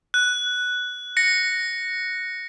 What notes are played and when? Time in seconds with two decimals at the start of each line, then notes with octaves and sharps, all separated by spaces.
0.14 F#6
1.17 A#6 C#7